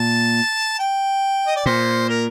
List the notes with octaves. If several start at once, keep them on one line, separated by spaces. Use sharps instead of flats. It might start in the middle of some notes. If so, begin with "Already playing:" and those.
Already playing: A#2 A5
G5
D#5
D5
A#2 C5
A#4